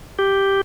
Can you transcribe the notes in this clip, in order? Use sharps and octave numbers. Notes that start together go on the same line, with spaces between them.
G4